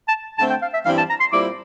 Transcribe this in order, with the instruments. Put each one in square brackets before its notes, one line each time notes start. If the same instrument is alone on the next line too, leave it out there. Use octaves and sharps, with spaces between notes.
[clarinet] A5
[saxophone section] D3 A3 C4 [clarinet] A5
[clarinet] G5
F5
E5
[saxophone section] G2 E3 G3 C4 E4 [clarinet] F5
[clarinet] A5
A#5
C6
[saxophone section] A#2 G3 C4 E4 [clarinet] D6